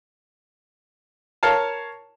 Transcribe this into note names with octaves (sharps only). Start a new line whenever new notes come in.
A#4 C#5 F5 A5